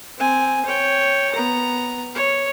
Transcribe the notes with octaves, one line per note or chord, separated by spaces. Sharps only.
C4 G#5
C#5 G5
B3 A#5
C#5